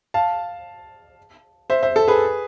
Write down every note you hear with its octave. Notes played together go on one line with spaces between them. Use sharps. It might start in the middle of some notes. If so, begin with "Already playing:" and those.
F5 A5
C5 E5
C5 E5
A4
G#4 B4